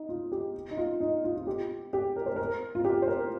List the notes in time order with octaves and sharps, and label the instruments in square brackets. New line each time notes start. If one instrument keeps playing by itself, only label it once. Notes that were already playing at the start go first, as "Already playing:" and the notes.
Already playing: [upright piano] D#4
F4
G4
D#4
F4
D#4
F4
F4
G4
G4
A#4
C5
A#4
F4
G4
C5
A#4